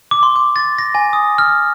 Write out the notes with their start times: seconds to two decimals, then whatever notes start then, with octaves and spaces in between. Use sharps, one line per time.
0.11 D6
0.23 C6
0.36 D6
0.56 A6
0.78 A#6
0.95 G#5
1.13 D#6
1.38 F6